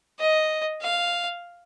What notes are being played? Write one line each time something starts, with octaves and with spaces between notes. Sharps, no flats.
D#5
F5